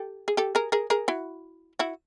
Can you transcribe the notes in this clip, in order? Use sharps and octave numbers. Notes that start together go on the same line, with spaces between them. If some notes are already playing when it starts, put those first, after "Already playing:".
Already playing: G4 A4
G#4
G4 A4
G#4 A#4
G#4 A#4
G#4 A#4
E4 F#4
E4 F#4